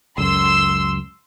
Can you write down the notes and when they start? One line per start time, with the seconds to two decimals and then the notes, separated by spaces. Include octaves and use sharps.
0.18 C#2 F#2 C6 E6